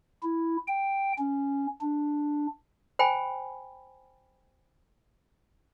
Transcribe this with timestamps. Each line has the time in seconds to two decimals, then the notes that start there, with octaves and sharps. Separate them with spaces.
0.23 E4
0.68 G5
1.19 C#4
1.81 D4
2.99 C5 G5 G#5 B5